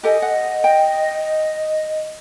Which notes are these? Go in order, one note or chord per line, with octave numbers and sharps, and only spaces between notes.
G4 A4 D#5 G#5
F#5
G5